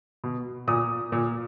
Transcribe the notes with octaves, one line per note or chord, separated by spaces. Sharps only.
B2
A#2 D#6
A#2